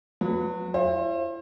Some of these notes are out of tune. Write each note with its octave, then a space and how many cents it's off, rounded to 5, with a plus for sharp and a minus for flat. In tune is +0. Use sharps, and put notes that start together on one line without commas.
F#3 -35 B4 +0
E4 +40 C5 +35